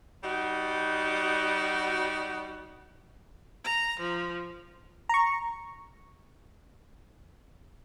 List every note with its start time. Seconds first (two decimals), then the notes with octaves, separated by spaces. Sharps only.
0.23 G3 D#4 F#4
3.64 A#5
4.00 F3
5.09 A#5 C#6